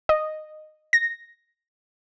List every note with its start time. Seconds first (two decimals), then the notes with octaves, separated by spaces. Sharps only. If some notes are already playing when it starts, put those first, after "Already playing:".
0.09 D#5
0.93 A#6